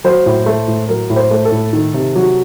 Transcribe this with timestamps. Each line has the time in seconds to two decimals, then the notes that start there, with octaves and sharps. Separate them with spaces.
0.04 F#3 C5
0.26 A2
0.46 A3
0.68 A2
0.89 F#3 A#4
1.10 A2
1.16 C5
1.31 A3
1.45 A4
1.52 A2
1.73 D#3
1.94 C3
2.15 F#3